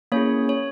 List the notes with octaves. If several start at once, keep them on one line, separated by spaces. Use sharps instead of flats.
A#3 C#4 E4 G#4 C#5
C#5